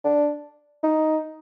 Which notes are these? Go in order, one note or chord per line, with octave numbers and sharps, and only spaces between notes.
D4
D#4